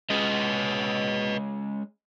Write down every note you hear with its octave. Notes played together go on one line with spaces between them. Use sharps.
G#3 C#4 B4 D#5